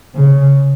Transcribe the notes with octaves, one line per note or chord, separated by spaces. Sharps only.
C#3